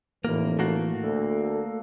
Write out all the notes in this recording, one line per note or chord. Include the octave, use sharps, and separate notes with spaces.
F1 A2 E3 A#3
A3 A#3 F#4
D2 A4